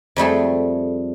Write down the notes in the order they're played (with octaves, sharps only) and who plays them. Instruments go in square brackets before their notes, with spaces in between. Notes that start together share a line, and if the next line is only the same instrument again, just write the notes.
[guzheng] F2 G3 A3 G#4